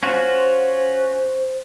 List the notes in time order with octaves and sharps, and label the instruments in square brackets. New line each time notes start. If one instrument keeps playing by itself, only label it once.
[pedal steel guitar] C#4 F4 F#4 [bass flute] C5